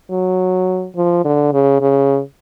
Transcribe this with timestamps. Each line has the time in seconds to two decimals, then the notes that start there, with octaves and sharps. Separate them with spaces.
0.10 F#3
0.96 F3
1.25 D3
1.53 C#3
1.81 C#3